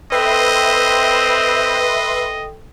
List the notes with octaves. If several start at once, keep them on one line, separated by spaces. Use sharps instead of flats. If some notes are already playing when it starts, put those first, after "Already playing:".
C4 A4 B4 D#5 E5 G5 C6